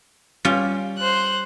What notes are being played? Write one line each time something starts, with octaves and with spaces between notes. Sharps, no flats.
G3 C#4 F4
C5 F#6